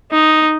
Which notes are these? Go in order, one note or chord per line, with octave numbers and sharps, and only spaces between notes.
D#4